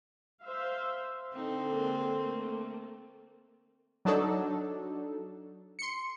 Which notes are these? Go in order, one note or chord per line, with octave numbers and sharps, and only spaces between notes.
C5 E5 F5
D3 C4 D#4
G#3 A#3
A3 A#3
F#3 D4 D#4 A4
C6 C#7